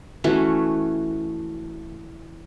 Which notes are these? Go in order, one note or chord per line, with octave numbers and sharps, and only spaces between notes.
E3 A3 C#4 F#4